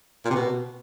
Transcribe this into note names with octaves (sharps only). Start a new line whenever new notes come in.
A#2
C3
B2